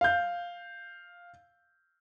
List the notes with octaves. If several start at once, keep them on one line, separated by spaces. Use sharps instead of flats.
F5 G6